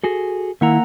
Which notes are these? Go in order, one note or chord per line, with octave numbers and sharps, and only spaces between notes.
F#4 G#4 A4
D#3 A#3 E4 F#5 A#5